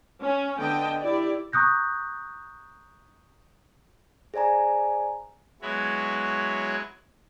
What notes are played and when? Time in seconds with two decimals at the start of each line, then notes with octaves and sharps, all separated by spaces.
0.21 C#4
0.59 D3 B3 D#5 G5 A5
1.00 E4 G4 D5
1.52 A#5 C#6 D#6 F#6 G6 A#6
4.34 G#4 C5 D5 G#5 A#5
5.62 F#3 G#3 B3 E4 F#4 C#5